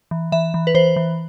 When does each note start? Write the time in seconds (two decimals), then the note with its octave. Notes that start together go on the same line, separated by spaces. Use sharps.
0.11 E3
0.32 E3 E5
0.54 E3
0.67 B4
0.74 E3 C5
0.96 E3